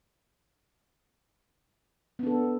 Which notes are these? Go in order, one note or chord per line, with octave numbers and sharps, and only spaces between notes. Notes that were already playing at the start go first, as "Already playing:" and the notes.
B3 D4 A4